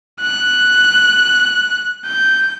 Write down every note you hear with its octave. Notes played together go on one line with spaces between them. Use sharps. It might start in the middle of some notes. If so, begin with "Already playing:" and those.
F#6
G6